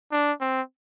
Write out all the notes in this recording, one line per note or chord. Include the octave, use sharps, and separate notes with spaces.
D4
C4